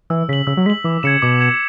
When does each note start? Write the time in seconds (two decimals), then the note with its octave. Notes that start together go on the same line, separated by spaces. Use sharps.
0.10 E3 E6
0.29 C#3 B6 F#7
0.47 C#3 E6
0.57 F#3
0.66 G#3 B6 F#7
0.84 E3 D6
1.03 C#3 G#6 C#7 E7
1.22 B2 D6
1.40 G#6 C#7 E7